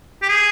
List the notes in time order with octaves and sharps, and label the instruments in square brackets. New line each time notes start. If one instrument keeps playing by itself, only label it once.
[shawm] G4
G#4